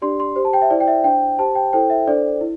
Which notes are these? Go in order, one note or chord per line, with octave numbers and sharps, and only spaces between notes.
D4 G4 D5 C6
C6
G4 C5
A5
G5
E5
E4 C5 D5
G5
E5
D4 C5 G5
G4 C5 A5
G5
E4 A4 C5 G5
E5
D4 A4 C5 D5
E4